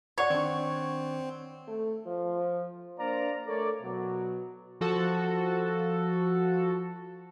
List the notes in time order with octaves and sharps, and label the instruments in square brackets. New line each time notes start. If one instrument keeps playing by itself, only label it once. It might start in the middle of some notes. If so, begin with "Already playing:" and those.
[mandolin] C#5 [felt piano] D5 F#5 C#6
[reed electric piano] D#3 D4 [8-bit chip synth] C4
[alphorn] A3
F3
[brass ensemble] A#3 D4 C5 D5 F5 A#5
A3 A4 A#4 C#5 D5
B2 F#3
[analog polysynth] F3 F#4 A4